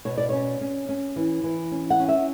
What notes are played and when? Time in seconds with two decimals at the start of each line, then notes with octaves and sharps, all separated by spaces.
0.05 B2 C#5
0.18 D5
0.29 C#4 C#5
0.61 C#4
0.89 C#4
1.16 E3
1.44 E3
1.72 C#4
1.90 F#5
2.00 C#4
2.08 E5